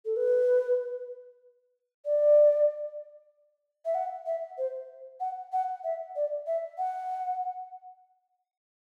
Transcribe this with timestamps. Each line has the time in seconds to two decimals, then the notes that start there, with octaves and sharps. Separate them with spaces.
0.05 A4
0.17 B4
2.05 D5
3.85 E5
3.95 F#5
4.26 E5
4.58 C5
5.20 F#5
5.53 F#5
5.84 E5
6.16 D5
6.47 E5
6.78 F#5